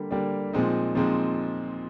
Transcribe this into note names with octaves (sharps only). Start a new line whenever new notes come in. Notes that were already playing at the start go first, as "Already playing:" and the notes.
Already playing: D3 G3 A#3 D4 G4
D3 G3 A#3 D4 G4
A#2 F3 G#3 C4 D#4
A#2 F3 G#3 C4 D#4